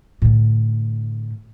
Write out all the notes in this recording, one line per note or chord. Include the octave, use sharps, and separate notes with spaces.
A2 D3